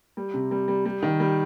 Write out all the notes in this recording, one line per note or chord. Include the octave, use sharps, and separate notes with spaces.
G3
C3
G3
G3
G3
D#3
G3